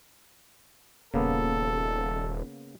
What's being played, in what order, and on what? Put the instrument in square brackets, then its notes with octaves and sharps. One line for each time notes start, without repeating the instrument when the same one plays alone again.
[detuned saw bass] D#1 [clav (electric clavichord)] C#3 A#3 B3 [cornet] A4